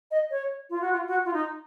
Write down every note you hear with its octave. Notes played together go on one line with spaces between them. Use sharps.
D#5
C#5
F4
F#4
F4
F#4
F4
D#4